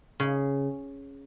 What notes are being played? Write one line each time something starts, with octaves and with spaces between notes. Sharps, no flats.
C#3